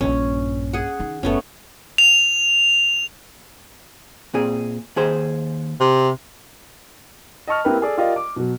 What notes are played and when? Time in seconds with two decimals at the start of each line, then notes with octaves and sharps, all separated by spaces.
0.01 A#1 G2 C#4
0.73 G#4 F#5
1.00 D#3 D#4
1.23 F#1 A2 A3 B3 C#4
1.98 F7
4.34 A#2 C4 G#4
4.96 D#2 G#4 C5
5.80 C3
7.48 D#5 A5 C#6 F6
7.65 A#3 C4 E4 G4 A#4 B4
7.82 G#4 A4 D5
7.97 F4 G4 A#4 D5 D#5 F5
8.16 D6
8.36 B2 F#3